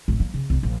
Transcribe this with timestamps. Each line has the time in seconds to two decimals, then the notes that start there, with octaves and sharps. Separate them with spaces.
0.08 A1 D3
0.20 G3 A#3
0.34 C#3
0.50 C2 D4
0.63 A#1